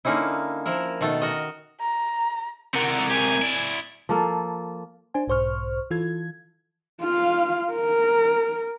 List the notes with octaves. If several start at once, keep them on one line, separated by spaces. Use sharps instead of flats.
D3 A#3 C#4 D#4 E4
F3 E4 A#4
B2 D#3 A3 A5
F#4 A#4 D#5
A#5
C3 A4 A#4 F#5
G#3 G4 G#5
E4 D5
F3 A#3 A4
D4 C5 G#5
B1 G#2 C5 C#6 F6
E3 F4 A4 G#6
F4 F5
A#4